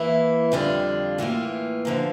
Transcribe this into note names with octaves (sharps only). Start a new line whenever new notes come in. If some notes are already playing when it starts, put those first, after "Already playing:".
Already playing: E3 A#3 E4
F2 D3 G3 D4 F4
A2 E3 A#3 F4
D3 F3 A#3